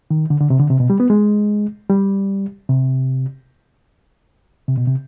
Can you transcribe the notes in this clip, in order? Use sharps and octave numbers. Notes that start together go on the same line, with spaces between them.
D#3
D3
D3
C3
D3
C3
B2
G3
B3
G#3
G3
C3
C3
B2
C3